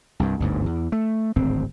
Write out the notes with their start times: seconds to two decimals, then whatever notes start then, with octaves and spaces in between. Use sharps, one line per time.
0.20 C2 G2
0.40 G1 D2 G#2
0.66 E2
0.92 A3
1.36 D1 G#1 C4